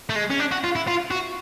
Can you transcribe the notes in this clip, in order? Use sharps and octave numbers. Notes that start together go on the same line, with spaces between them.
A3
G#3
C#4
D4
F#4
F4
E4
F4
F#4